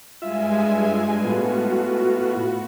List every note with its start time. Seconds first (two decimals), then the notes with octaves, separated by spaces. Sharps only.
0.22 G2 G#3 F4 E5 G#5
1.24 A2 B3 F4 F#4